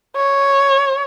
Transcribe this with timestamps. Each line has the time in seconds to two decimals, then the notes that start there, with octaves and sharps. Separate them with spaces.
0.16 C#5